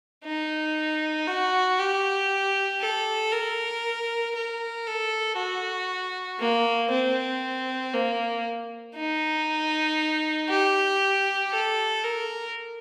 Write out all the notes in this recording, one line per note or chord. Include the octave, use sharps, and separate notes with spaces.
D#4
F#4
G4
A4
A#4
A#4
A4
F#4
A#3
C4
A#3
D#4
G4
A4
A#4